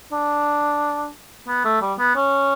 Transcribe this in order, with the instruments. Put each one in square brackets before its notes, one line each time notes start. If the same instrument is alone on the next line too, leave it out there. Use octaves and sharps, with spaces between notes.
[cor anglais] D4
B3
A3
G3
B3
C#4